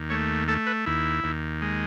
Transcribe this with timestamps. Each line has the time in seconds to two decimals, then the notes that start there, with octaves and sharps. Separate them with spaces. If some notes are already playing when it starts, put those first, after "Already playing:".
Already playing: D#2
0.10 A3 C#5
0.48 A3 A4
0.67 B4
0.86 D#2 E4
1.24 D#2
1.62 G#3